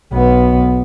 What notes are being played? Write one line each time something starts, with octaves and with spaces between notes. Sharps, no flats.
B1 B3